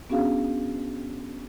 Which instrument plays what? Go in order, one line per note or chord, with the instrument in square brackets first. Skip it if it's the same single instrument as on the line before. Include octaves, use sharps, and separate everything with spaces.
[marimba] B3 C#4 D4 F#4 G#4 F5